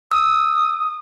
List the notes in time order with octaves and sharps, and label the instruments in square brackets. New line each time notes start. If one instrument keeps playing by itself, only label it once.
[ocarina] D#6 [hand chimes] E6